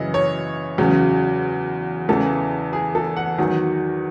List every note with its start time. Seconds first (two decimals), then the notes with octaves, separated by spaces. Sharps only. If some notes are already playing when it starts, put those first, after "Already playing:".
Already playing: F#2 C#3 E3 D#5
0.14 C#5
0.78 E2 C#3 F#3
2.09 E2 C#3 E3 A4
2.73 G#4
2.95 A4
3.17 F#5
3.38 E2 D#3 F#3